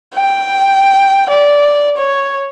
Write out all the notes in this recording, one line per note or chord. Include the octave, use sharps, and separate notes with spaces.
G5
D5
C#5